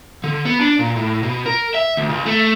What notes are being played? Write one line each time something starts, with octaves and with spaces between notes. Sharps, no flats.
D3
B3
D4
A#2
A2
B2
A#4
E5
D2
C#2
A3